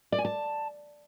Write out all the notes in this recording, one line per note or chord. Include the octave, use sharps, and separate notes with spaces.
D5
G#5
A5